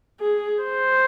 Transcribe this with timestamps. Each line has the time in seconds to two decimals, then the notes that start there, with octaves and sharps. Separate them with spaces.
0.20 G#4
0.63 C5